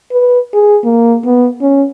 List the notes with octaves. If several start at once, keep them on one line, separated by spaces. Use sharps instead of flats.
B4
G#4
A#3
B3
C#4